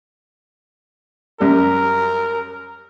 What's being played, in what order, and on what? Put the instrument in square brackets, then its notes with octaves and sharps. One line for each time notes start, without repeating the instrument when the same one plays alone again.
[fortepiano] F#2 G3 [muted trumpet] A#4